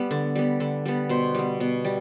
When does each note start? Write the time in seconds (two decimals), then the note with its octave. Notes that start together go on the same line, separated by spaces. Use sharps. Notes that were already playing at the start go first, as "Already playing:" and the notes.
Already playing: G3 B3
0.11 D3
0.36 G3 B3
0.60 D3
0.85 G3 B3
1.09 B2 C5
1.35 G3 B3
1.60 B2
1.85 G3